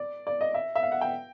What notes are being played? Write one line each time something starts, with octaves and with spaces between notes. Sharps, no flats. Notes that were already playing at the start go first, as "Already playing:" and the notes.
Already playing: D5
D5
D#5
E5
E5
F5
F#5
G5